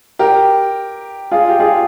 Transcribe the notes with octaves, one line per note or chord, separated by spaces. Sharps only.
G4 A#4
F4 G#4
G4
F4 G#4